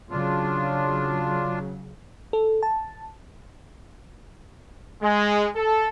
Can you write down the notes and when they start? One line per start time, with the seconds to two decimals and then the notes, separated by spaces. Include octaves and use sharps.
0.10 C#3 F#3 D4 F4
2.33 A4
2.63 A5
5.02 G#3
5.56 A4